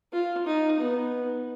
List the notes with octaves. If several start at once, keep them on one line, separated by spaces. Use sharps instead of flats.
F4
D#4
B3